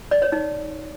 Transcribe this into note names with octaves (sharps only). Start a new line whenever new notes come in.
D5
C#5
D#4